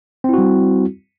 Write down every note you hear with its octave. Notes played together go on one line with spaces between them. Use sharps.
G3 C4 E4 F#4